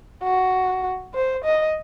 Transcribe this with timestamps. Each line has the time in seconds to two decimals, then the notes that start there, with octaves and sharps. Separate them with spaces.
0.23 F#4
1.15 C5
1.44 D#5